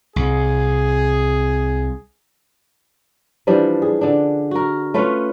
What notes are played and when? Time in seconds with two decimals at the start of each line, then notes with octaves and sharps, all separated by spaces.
0.16 C2 C3 G#4
3.47 E3 F3 G3 D4
3.82 G#4
4.01 D3 D4
4.51 F#4 A#4
4.94 A3 C#4 F4 B4